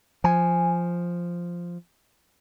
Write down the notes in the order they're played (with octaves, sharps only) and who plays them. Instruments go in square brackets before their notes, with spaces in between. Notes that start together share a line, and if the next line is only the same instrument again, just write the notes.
[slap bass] F3 [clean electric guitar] G#5